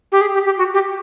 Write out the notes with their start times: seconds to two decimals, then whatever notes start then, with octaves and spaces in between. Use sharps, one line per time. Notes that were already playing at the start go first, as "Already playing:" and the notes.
0.12 G4
0.21 G#4
0.34 G4
0.45 G4
0.58 F#4
0.74 G4